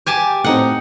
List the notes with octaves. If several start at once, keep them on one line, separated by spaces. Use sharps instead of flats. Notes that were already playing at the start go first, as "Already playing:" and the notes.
G4 G#5 A5
A2 C4 D#4 F#5